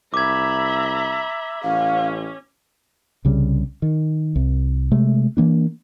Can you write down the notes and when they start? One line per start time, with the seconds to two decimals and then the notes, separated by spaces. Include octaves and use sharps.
0.14 C2 E5 A#5 B5 D6 G#6
1.63 A1 C#4 F5
3.25 C2 C#3 G3
3.82 D#3
4.36 C2
4.92 C3 G#3 A3
5.37 E3 A#3 D4